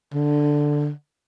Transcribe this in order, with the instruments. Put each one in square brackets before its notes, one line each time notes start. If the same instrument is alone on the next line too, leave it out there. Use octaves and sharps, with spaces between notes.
[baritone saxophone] D3